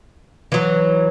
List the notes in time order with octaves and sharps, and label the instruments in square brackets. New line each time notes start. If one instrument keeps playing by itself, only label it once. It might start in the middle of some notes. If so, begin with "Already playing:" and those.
[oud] E3 F#3